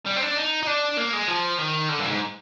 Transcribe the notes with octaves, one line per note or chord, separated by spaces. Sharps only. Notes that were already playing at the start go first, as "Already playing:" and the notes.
G3
C4
D4
D#4
D#4
D4
A#3
G#3
F3
D#3
D3
G2
A#2
G#2